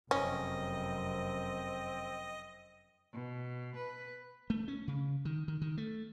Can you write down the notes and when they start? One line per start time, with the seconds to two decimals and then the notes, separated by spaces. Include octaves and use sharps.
0.11 F1 F#2 C4 C#4 D#5
3.13 B2
3.76 B4
4.50 A3
4.68 C#4
4.87 C#3
5.25 D#3
5.48 D#3
5.62 D#3
5.78 A3